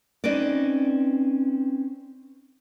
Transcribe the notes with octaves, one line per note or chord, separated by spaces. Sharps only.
C4 C#4 D#4 B4 D5